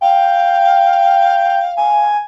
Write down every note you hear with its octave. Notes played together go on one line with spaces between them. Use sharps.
F5 G5
G#5